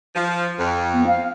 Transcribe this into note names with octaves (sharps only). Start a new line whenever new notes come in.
F3
F2
B3
F5